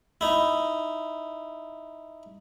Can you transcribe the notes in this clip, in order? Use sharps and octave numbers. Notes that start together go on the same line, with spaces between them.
D#4 E4